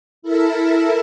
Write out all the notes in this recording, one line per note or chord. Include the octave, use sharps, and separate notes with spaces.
E4 A4 A#4 E5